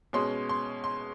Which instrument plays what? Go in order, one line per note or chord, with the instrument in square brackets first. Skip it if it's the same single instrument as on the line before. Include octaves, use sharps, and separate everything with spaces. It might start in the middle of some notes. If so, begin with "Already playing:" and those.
[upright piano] B2 G#3 C#4 C6
C6
C6